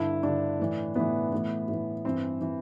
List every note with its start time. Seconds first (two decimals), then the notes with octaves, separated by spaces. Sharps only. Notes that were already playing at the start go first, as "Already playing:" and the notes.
Already playing: G2 D3 E4
0.23 G2 D3 D4
0.60 A2 E3
0.95 A2 E3 B3
1.32 A2 E3
1.68 A2 E3
2.05 G2 E3 C4
2.41 E3